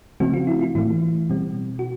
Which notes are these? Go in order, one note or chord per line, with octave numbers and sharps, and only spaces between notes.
C#3 F3 A3 C4 F#4
F4
E4
F4
A2 E3 A3 E4
B2 G3 C4
F#4